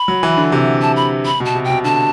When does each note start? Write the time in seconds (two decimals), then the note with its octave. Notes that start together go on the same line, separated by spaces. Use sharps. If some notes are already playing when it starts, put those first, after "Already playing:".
Already playing: B5
0.08 F#3
0.23 E3
0.37 D3
0.52 C3
0.82 A5
0.96 B5
1.26 B5
1.40 B2
1.46 A5
1.55 C3
1.65 G5
1.70 B2
1.84 D3 A5